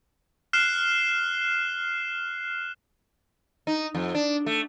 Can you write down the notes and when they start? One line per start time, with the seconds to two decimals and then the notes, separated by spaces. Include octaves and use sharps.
0.53 F6 F#6 C7 E7 G7
3.67 D#4
3.95 F2
4.14 D4
4.46 A3